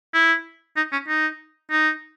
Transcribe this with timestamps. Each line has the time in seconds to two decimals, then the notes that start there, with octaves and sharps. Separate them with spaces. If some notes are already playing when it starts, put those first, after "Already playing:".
0.14 E4
0.76 D#4
0.92 C#4
1.08 D#4
1.71 D#4